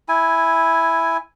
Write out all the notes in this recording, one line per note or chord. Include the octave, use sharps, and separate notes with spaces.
E4 G#5